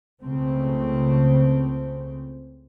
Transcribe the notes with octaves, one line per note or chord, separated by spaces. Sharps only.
C#2 C#3 A3 C4